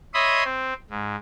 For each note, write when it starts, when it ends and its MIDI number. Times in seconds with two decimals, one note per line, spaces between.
0.14 0.43 73
0.14 0.43 75
0.14 0.43 76
0.14 0.43 83
0.14 0.43 84
0.14 0.43 87
0.44 0.73 60
0.90 1.16 44